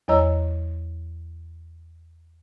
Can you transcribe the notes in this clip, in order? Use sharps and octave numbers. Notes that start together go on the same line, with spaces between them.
E2 F#3 C#5 D#5 A#5 E6